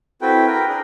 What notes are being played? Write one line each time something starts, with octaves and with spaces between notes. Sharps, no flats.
C4 E4 F#4 A4 B4 G5
A#4 B4 G5
D4 G#4 A#4